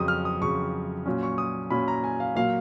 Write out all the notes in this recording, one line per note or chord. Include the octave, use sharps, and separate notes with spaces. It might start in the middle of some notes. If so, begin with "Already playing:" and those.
Already playing: F2 C#3 F#3 D#6
F6
D#6
F2 C#3 F#3 C#6
A#2 F#3 C#4
C#6
D#6
A#2 F#3 C#4 B5
A#5
G#5
F5
A#2 F#3 A#3 F5